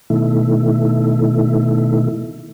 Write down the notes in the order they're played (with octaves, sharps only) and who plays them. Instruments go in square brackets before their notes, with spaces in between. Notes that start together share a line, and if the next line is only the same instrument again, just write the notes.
[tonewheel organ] B2 D#3 A3 E4